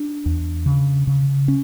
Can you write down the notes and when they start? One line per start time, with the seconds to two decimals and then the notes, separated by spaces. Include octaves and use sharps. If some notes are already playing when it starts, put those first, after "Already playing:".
Already playing: D4
0.26 E2
0.66 C#3
1.07 C#3
1.48 C#4